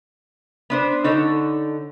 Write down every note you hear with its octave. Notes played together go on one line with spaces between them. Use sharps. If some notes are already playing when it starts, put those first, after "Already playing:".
B3 D4 C5
D3 D#4 A4 C#5